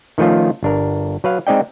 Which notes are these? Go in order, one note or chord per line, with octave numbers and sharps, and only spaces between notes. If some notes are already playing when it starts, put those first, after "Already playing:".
D#3 F3 A3 C#4 F4
G1 D4 A#4
F#3 B4 F5
G#3 C4 D#4 D5 D#5 G5